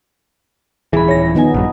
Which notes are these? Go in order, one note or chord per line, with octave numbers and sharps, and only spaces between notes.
D#1 E3 G#4 B5
C#5 A#6
D#3 F3 B3 D#4 G#5
A#1 G2